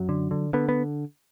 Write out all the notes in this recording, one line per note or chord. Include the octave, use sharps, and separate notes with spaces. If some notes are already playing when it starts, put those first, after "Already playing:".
Already playing: F#2 F#3
D3
D3
D3 B3
B3